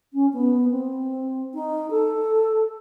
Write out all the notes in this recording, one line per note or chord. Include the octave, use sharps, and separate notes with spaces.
C#4
B3
C4
D#4
A4